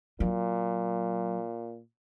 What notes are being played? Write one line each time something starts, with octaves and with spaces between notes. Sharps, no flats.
A#2 F#3